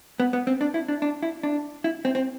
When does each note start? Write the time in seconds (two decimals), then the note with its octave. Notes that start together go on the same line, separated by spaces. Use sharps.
0.20 B3
0.33 B3
0.47 C4
0.61 D4
0.74 E4
0.88 D4
1.02 D4
1.23 E4
1.43 D4
1.84 E4
2.05 C4
2.15 C4